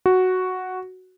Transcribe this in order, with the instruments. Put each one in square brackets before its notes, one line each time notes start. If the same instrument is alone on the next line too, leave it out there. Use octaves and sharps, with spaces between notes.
[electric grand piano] F#4